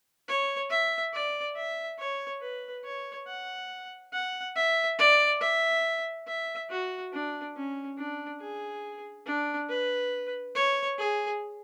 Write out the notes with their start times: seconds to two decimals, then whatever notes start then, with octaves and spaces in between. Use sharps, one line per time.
0.28 C#5
0.70 E5
1.13 D5
1.56 E5
1.98 C#5
2.41 B4
2.84 C#5
3.27 F#5
4.13 F#5
4.56 E5
4.98 D5
5.40 E5
6.27 E5
6.70 F#4
7.13 D4
7.56 C#4
7.97 D4
8.40 G#4
9.26 D4
9.69 B4
10.55 C#5
10.98 G#4